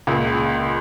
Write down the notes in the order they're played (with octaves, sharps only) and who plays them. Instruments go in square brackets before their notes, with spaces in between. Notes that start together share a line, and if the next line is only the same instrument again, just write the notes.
[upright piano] C#2 A#2